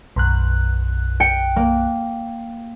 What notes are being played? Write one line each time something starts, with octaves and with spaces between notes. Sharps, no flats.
B1 F#2 F#6
G5 C#7
A#3